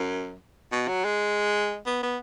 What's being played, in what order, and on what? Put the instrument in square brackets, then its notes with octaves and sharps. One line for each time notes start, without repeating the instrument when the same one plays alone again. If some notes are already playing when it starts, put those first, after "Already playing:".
Already playing: [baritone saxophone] F#2
B2
F#3
G#3
B3
B3